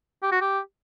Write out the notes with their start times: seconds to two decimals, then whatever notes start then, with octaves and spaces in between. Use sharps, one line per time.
0.22 G4
0.32 F#4
0.41 G4